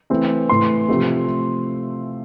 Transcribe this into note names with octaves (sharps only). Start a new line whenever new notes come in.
E3 A3 C4
A2 E3 A3 C6
C3 F3 A3 C4